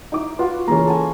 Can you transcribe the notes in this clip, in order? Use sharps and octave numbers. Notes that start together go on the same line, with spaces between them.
D#4 E4 D6
F4 F#4 B4
C#3 E3 A#3 C#4 A#4
A4 G#5